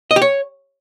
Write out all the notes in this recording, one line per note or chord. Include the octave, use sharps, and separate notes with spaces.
D#5
G4
C#5